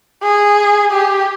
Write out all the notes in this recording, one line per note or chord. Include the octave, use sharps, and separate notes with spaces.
G#4
G4